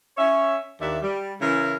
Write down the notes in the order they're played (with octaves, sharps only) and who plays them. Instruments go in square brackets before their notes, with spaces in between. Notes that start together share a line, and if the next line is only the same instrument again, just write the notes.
[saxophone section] C#4 C#5 E5
D#2 D4 E5
G3
C#3 E3 E4 A#4